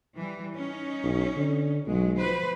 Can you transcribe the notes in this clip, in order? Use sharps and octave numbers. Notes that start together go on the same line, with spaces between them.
E3 G3
C#4 D#4
B1
D3
B1 F#3 G#3
F3 B4 C5